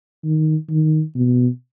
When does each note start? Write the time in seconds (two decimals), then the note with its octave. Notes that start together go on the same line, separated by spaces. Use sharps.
0.24 D#3
0.70 D#3
1.15 B2